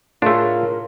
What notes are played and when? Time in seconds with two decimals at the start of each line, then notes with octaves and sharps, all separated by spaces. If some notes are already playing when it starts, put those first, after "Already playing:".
0.22 A2 A3 D4 F4 G#4 A#4 C#5